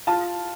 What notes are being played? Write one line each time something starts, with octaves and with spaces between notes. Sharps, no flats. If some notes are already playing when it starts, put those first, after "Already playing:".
F4 A5